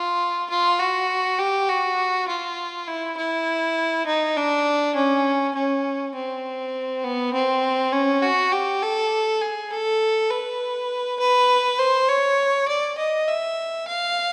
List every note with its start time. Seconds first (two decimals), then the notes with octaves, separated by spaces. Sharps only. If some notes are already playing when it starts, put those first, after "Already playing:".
Already playing: F4
0.50 F4
0.80 F#4
1.39 G4
1.69 F#4
2.28 F4
2.88 E4
3.18 E4
4.06 D#4
4.37 D4
4.95 C#4
5.55 C#4
6.15 C4
7.04 B3
7.34 C4
7.93 C#4
8.22 F#4
8.52 G4
8.82 A4
9.42 G#4
9.71 A4
10.31 B4
11.20 B4
11.79 C5
12.09 C#5
12.68 D5
12.98 D#5
13.28 E5
13.88 F5